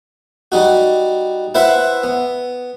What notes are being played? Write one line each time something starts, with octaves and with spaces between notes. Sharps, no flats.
G3 D#4 F#4
E4 B4 C5 E5 F#5
B3